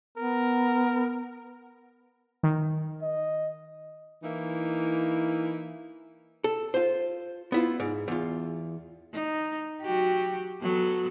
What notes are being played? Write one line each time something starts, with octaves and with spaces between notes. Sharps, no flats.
B3 A#4
D#3
D#5
E3 A#3 D#4 E4
A4
F4 C5
B3 E4 F4
G#2
E2 F4
D#4
F#3 F#4 G4
F#3 B3 A4